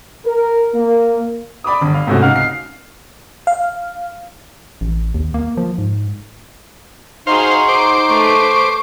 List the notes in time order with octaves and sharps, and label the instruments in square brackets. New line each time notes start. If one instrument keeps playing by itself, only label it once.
[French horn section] A#4
A#3
[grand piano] D5 B5 D6 D#6
G1
F5
G#2 C3 A3 C#4 F#4
C#3 D#4 F5 F#5 F6
C7
[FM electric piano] F5
[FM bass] A1
D#2
A#3
F3
G#2
[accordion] D#4 [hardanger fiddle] F#4 G#4 [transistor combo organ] C5 F5 [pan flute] C6
[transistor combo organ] C5 D6
[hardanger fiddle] A3 B4 [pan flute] C#6